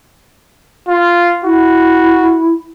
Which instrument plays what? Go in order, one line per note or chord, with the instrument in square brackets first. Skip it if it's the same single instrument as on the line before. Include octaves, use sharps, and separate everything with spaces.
[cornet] F4
[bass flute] E4 [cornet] F#4